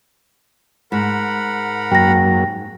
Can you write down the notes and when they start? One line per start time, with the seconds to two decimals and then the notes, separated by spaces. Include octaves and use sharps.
0.92 G#2 A#4 F#5 B5
1.91 F#2 F#3 A#3 G5 A#6